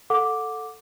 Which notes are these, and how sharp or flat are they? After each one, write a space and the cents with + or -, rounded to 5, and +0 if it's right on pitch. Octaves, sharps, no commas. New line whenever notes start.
A4 +0 F#5 -25 D6 +0